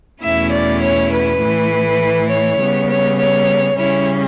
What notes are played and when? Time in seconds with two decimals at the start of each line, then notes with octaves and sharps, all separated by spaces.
0.22 E2 B2 A3 C#4 E4 E5
0.51 D5
0.81 C#5
1.11 B4
1.40 A2 E3 A3 E4
2.29 C#5
2.59 C#3 G3 B3
2.89 C#5
3.18 C#5
3.77 C#3 G3 C#4 E4 C#5